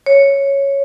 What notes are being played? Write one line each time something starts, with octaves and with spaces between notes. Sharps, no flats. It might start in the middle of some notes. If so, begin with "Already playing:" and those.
C#5